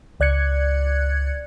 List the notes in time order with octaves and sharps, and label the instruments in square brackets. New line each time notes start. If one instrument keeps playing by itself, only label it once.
[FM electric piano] C#2 D5 F#6 G#6 C#7